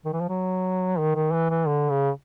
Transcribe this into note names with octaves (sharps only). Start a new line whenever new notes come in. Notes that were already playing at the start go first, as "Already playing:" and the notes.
D#3
E3
F3
F#3
D#3
D#3
E3
E3
D3
C#3